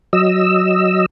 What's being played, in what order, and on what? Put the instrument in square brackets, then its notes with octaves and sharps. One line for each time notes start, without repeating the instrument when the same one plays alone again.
[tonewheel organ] F#3 D#5 E6